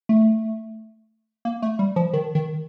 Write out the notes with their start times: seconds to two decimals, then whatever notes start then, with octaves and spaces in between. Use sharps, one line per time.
0.09 A3
1.45 A#3
1.62 A3
1.79 G3
1.96 F3
2.13 D#3
2.35 D#3